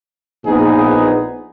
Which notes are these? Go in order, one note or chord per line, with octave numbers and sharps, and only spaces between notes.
A#1 A#2 B3 D#4 G#4